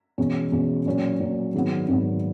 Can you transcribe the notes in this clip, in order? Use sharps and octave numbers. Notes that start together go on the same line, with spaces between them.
E2 B2 G#3 C#4
E2 B2 G#3 C#4
A#2 F#3 C#4
A#2 F#3 C#4
G#1 G#2 F#3 B3
G#1 G#2 F#3 B3